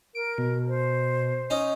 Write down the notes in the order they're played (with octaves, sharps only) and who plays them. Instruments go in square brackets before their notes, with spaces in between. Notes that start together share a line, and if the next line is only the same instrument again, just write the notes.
[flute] A#4 [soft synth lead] D7
[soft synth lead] B2
[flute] C5
[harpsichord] C#4 D#4 D#5